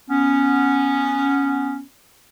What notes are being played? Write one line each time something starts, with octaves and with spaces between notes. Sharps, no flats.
B3 C#4